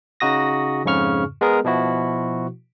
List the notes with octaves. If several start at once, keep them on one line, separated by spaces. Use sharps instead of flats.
C#3 D#4 F#4 D#6 A#6
F2 G#2 C#3 C#6 F6
G#3 B3 G#4 A#4
B2 F3 E4 F#4